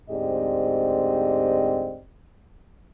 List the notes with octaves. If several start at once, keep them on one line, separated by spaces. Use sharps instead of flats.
D2 G#2 C4 G4 D5 D#5